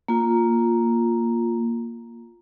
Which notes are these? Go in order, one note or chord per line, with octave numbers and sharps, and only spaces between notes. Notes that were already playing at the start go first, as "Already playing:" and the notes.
A#3 F4